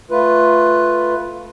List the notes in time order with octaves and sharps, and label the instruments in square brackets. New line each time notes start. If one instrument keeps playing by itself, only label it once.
[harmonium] A3 F4 B4